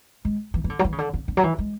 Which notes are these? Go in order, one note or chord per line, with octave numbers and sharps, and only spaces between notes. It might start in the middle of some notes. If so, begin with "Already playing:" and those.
G#3
E3
E3
D3
F#3
E3
C#3
D3
C#3
D3
F#3
E3
G#3